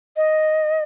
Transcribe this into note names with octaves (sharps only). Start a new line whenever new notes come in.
D#5